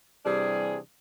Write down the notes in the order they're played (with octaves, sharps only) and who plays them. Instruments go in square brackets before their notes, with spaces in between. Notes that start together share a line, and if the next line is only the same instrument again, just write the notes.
[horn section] C3 E3 G3 D4 G#4